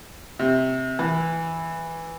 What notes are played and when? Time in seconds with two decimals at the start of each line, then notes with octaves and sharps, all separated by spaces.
0.39 C3
0.99 E3